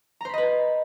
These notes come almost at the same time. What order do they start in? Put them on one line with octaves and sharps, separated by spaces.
A#5 C5 B5 D#5 B4